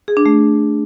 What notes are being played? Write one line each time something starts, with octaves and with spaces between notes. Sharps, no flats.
G#4
D4
A3